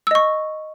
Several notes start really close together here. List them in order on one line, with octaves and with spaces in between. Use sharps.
E6 D#5 C#6